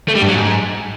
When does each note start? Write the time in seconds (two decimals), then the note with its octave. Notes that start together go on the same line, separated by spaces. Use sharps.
0.08 A3
0.15 G3
0.22 G2
0.29 F#3
0.36 G#2